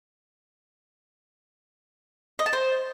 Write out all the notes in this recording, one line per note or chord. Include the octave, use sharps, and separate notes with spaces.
D#5
A5
C5